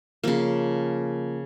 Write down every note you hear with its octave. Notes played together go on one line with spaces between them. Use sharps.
C#3 F3 A#3